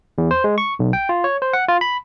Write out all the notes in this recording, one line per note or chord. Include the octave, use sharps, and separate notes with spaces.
E2
C5
G#3
C#6
B1
G5
F4
C#5
C5
F#5
F4
B5